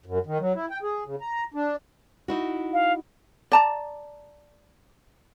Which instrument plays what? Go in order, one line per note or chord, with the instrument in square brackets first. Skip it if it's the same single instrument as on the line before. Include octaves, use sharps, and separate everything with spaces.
[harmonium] F#2
D#3
F#3
E4
G5
G#4
C#3
A#5
D4
[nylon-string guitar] D#4 E4 F#4
[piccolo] F5
[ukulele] D5 A5 A#5